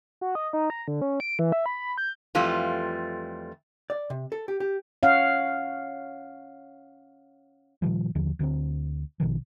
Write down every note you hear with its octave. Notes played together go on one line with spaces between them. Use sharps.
F#4
D#5
D#4
A#5
D3
C#4
D7
E3
E5
B5
G6
F2 E3 G3 A3 F4
D5
C3
A4
G4
G4
C#4 C#5 F5 F#5
A#2 D#3 F3 G3
D#2 D3 F3
D2 D3 G#3 C4
A#1 B2 D#3 F3